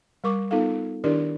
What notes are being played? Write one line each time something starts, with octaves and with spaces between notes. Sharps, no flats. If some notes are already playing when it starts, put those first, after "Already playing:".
G3 A#4 C#6 D6
B3 D#4 F4 A4 F5
D#3 D4 E4 G4 A#4 D5